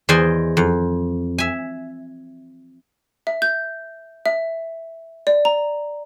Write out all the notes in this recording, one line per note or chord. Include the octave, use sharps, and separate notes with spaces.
E2 C5 D5 D#5 G#5
F2
E5 G#5
E5
G6
E5
D5
A#5